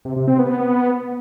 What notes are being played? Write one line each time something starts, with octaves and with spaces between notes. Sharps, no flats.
C3
C3
C4
B3